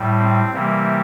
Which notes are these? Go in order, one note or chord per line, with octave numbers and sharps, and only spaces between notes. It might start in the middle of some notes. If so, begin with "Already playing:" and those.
Already playing: A2 G3
C4
C3 E3 G3 A#3